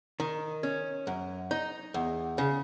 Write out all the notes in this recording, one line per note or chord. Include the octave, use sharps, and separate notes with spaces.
D#3
C#4
F#2
D#4
E2
C#3